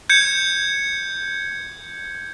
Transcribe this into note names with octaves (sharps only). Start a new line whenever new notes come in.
G6 G#6 C#7